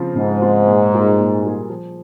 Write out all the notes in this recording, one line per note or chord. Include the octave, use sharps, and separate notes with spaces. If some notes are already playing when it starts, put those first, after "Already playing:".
Already playing: C#3 F3 C4 F4
G#2 C#3
F3 C4 F4
A#2
G3 A#3 F4 G#4
A#2
G3 A#3 F4 G#4
F3